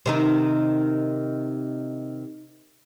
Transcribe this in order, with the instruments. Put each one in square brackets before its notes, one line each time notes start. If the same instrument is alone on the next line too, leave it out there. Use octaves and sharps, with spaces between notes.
[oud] C3 D#3 D#4